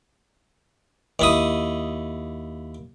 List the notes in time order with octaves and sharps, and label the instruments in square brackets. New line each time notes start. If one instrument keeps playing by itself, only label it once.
[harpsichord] D#2 E4 D#6